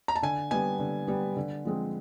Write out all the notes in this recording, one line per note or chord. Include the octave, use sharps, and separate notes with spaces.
A#5
A5
D3 G#5
G3 B3 G#5
D3
G3 B3
D3
F3 G#3 C4